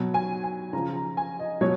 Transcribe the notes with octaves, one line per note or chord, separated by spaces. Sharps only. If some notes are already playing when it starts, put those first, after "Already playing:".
Already playing: B2 F#3
G#5
G#5
C#3 F3 A#5
A#5
G#5
D#5
B2 F#3 C#5